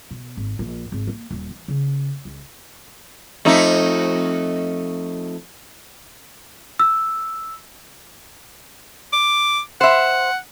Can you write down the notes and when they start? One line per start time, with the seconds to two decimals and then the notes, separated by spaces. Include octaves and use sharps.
0.11 B2
0.37 G#1
0.59 A#1
0.92 G#1
1.07 A#3
1.31 D#1
1.50 E3
1.68 C#3
2.25 C#2
3.45 F2 A3 D#4
6.79 E6
9.13 D6
9.81 C5 E5 F#5